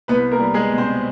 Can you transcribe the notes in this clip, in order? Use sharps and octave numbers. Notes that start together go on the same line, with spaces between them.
C2 B3 B4
A#3 A#4
G3
G#3 G#4
B2
C4 C5